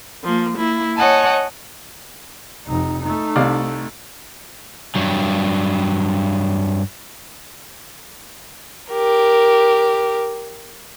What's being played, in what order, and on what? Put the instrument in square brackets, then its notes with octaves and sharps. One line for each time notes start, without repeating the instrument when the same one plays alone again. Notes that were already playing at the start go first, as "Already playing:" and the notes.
[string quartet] F3 A#3
A#3 E4
C#5 D#5 F#5 G#5 A5
[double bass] F1 D#4
A3 D#4
[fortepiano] C2 D5 F5
[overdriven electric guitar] G2 F#3
[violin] G4 A#4